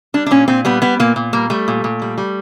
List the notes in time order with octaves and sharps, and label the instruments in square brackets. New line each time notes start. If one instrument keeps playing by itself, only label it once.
[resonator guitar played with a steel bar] G3 D4
D4
A#2 C#4
A#2 C4
G3 B3
G3 B3
A#2 A#3
A#2
G3 A#3
G3 A3
A#2
A#2
G3
G3